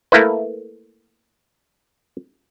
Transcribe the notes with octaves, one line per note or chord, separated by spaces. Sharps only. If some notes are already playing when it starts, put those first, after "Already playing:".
A3 A#3 E4 B4